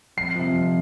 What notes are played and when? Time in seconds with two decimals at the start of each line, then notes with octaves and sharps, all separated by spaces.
0.17 F2 C7
0.36 C3 F3
0.54 F2